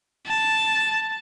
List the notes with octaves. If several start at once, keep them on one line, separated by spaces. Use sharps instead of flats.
A5